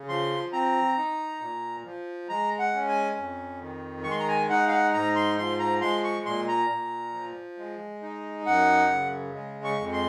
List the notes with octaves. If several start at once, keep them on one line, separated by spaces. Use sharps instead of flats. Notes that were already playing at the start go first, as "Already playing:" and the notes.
Already playing: C#3
F3 C6
C4 A#5
D#4
A#2
F3
G#3 A#5
F#5
C#4
G#5
F2
D#3
G#3 C#6
C6
A#5
G#5
D#4 F#5
F5
F#5
G#2 A#5
C6
F3 C6
A#5
G#3 C6
C#6
A#2 C6
A#5
A#2
F3
G#3
D#4
F#2 F#5
C#3
G#3
C#6
F2
C6